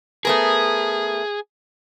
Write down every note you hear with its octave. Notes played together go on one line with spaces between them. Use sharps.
A3 B3 G#4 A#4